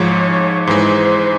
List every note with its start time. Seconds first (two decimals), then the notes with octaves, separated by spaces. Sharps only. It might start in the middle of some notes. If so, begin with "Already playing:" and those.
Already playing: G#2 F3 G#3 C#5
0.67 G#2 E3 G#3 C5